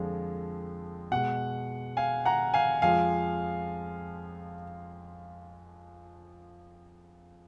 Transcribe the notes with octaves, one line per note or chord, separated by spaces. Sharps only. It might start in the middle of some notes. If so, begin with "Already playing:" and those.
Already playing: F2 D3 F3 G#3
B2 G#3 F#5
F5 G#5
F#5 A#5
F5 G#5
F2 F3 G#3 F5 G#5